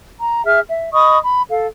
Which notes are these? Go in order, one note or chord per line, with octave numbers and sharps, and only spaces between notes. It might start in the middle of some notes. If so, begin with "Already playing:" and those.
A#5
G#4 E5 F6
E5
D#5 B5 C#6 D#6
B5
A4 F5